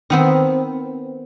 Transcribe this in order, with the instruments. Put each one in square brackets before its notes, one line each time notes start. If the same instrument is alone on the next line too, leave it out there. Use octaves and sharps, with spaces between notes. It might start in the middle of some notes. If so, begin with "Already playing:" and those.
[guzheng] D#3 B3 C4